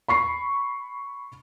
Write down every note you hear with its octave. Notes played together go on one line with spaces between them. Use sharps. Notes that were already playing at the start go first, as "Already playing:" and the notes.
B5 C#6 C7